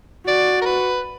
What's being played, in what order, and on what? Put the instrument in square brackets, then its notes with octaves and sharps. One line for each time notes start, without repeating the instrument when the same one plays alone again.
[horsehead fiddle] F#4 [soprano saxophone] D5
[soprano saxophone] A#4
B4